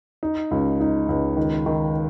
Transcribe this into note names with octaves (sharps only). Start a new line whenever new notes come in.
D#4
C#2
D#4
C#2
D#3
D#3